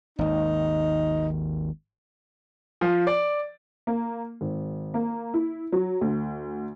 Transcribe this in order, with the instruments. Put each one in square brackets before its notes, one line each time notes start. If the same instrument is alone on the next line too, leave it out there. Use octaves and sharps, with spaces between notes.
[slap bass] G#1 D#2 [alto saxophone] D#4
[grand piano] F3
D5
[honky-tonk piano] A#3
G#1
A#3
E4
F#3
D2